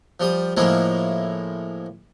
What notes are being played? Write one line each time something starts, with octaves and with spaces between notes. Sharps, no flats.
F3 G3 D#6
A2 F3 G#3 A#3 E4 F4